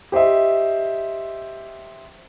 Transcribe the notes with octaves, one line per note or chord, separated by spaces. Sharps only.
G4 C5 D#5 E5